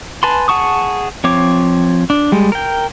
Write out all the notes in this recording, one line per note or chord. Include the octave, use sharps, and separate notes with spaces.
B4 G#5 A5 B5 C6
G#4 F#5 A5 C#6 D#6
F3 C4 C#5 D6
D4
G3 G#3
A#4 G5